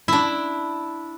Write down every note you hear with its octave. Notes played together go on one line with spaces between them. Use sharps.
D4 E4